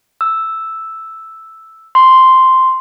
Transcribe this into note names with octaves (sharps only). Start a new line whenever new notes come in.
E6
C6